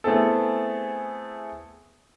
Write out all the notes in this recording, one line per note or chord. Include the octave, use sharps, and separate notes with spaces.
A3 B3 C4 E4 G#4 A4